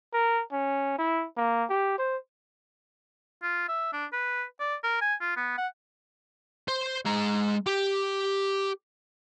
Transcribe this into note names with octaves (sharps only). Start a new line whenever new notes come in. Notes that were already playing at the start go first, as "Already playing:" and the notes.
A#4
C#4
E4
A#3
G4
C5
F4
E5
D4
B4
D5
A#4
G#5
F4
B3
F#5
C5
G#3 A#5
G4